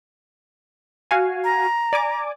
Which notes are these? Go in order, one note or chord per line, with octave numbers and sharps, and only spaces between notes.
F#4 F5 G#5
A#5
D5 G#5 D6